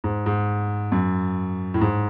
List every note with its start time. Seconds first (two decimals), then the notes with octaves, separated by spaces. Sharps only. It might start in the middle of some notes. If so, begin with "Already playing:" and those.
0.04 G#2
0.26 G#2
0.92 F#2
1.74 A2
1.81 G#2